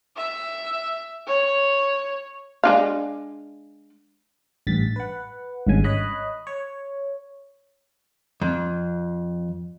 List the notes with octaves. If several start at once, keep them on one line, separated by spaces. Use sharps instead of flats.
E5
C#5
G#3 D4 F5
A1 G2 A6 B6
B4 F#5
G#1 G2 C#3 G#5
C#5 D#5 B5 F#6
C#5
F2